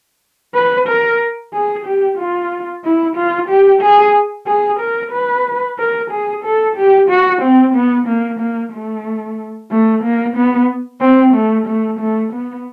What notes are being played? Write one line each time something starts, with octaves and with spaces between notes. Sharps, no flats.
B4
A#4
G#4
G4
F4
E4
F4
G4
G#4
G#4
A#4
B4
A#4
G#4
A4
G4
F#4
C4
B3
A#3
A#3
A3
A3
A#3
B3
C4
A3
A3
A3
B3